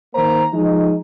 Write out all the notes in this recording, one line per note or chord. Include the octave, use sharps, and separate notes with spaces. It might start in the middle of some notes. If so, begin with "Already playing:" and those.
D#3 A#3 C5 A#5
F3 G#3 D#4